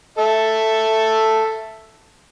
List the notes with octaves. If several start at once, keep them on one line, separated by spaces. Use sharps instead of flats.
A4 E5